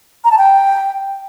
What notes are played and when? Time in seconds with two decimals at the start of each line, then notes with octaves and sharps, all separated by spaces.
0.24 A#5
0.31 A5
0.38 G5